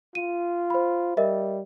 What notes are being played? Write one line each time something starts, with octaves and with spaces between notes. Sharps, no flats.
F4 D#7
C5 B5
G3 A#4 D#5 E5